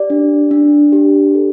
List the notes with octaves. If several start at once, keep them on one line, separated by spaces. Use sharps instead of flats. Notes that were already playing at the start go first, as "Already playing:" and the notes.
Already playing: G4 D5
D4
D4
G4
A4